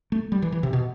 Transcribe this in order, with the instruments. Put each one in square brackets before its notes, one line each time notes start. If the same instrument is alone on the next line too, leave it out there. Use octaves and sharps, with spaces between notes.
[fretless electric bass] A3
G3
E3
E3
C3
B2